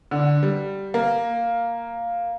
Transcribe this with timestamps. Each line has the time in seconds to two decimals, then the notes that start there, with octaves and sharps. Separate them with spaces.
0.11 D3
0.43 G3
0.94 A#3